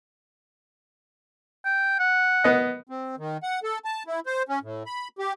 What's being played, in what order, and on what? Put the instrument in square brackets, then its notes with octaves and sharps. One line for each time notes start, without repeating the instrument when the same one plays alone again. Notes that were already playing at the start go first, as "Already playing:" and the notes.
[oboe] G5
F#5
[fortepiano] B3 D#5
[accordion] C4
D#3
F#5
A4
A5
E4
C5
C#4
A2
B5
G4